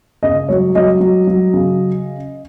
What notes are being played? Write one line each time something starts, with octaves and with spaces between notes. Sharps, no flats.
C#3 D#5
F#3 C#5
F#3 D#5
F#3
F#3
C#3